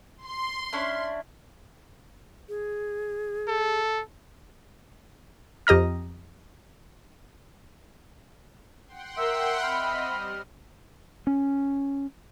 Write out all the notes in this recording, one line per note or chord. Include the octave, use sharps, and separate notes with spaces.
C6
C#4 D4 E4
G#4
A4
F2 G4 D#5 A#5 F6
F#5 G5 C6
A#4 E5 E6
C4 D#5 B5 F6
G3
C#4